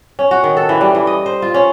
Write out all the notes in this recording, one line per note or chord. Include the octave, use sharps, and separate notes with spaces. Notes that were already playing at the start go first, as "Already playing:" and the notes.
C#4
F#4
D#3
A4
E3
G3
E3
D#5
C5
F4
C#4